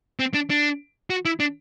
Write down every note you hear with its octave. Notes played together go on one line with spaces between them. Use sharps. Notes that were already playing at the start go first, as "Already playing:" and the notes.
C4
D4
D4
F#4
E4
D4